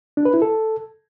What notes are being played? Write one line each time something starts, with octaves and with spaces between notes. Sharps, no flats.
D4
B4
E4
A4